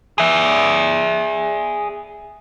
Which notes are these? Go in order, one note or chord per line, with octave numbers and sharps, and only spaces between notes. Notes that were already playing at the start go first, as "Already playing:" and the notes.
G#4 E5